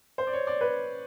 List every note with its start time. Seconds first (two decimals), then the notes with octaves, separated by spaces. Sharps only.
0.18 C5
0.27 D5
0.33 C#5
0.47 D5
0.61 B4